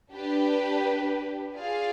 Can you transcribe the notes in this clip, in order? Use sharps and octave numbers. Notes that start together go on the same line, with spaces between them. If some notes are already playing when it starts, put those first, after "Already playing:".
D4 G4 B4
F4 G#4 D5 F5